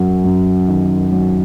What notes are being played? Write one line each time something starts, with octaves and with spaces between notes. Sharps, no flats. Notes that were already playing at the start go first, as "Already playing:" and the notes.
Already playing: F#2 F#3
F#2
D#3
F#3